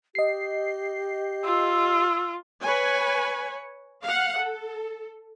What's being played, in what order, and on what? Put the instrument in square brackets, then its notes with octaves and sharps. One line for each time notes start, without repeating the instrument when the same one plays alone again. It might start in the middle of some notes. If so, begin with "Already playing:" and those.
[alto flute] G4 [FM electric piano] D#5 C7
[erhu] F4 [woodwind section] E6
[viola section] B4 C#5 G#5
F5 F#5
A4